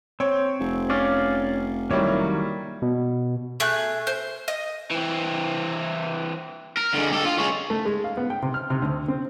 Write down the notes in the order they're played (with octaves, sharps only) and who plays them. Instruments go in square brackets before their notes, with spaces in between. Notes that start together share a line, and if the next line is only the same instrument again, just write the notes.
[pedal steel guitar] C4 [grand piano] C#5
[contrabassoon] F1
[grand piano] C#4 [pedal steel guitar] D5 F5
[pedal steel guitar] D#3 F#3 A#3 [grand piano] G3 E4 C#5
[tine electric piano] B2
[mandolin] A3 G#4 F#6
C5
D#5
[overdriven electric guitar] E3 C4
A#4
D3 G#3
G4 A4
F4
G#3 C#4
[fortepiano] A3
G#3
F5
B3
G5
C3
F6
C3
D2
C4